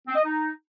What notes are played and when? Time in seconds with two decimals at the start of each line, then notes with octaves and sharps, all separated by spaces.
0.07 C4
0.15 D#5
0.24 D#4